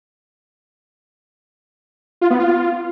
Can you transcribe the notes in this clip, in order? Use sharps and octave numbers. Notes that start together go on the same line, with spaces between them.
F4
B3
F4